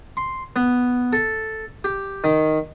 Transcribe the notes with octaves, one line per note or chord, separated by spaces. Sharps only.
C6
B3
A4
G4
D#3